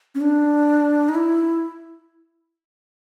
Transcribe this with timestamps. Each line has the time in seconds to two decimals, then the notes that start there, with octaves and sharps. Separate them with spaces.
0.15 C#4
0.21 D4
1.09 D#4
1.15 E4